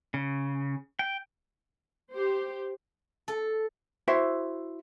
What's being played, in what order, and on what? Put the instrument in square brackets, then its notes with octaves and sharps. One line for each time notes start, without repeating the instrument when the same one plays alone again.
[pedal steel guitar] C#3
G5
[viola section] G4 C5
[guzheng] A4
[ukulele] E4 F#4 C5 E5